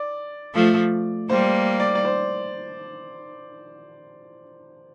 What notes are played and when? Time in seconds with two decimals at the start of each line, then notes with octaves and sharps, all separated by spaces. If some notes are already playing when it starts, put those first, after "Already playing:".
Already playing: D5
0.54 F3 A3
1.29 G3 A#3 C5
1.80 D5
1.95 D5
2.05 C5